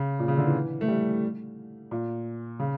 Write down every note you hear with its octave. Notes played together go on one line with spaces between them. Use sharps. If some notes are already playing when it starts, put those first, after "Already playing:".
Already playing: C#3
A#2
C#3
D3
E3
A3
G3
A#2
C#3